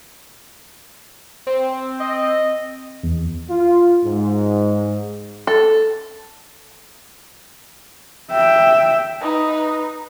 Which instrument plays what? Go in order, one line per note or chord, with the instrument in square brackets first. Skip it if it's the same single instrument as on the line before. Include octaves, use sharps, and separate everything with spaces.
[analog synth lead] C4
[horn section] D#5
[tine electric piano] E2
[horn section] F4
G#2
[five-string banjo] A4
[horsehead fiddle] E5 G5
[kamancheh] D#4 B4